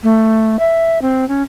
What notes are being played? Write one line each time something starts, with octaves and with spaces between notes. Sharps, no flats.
A3
E5
C4
C#4